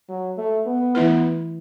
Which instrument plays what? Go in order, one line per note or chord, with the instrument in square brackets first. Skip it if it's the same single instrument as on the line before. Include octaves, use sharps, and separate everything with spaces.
[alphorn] F#3
A3
B3
[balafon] E3 A3 E4 B4